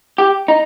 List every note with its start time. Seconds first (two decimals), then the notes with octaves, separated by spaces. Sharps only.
0.18 G4
0.48 D#4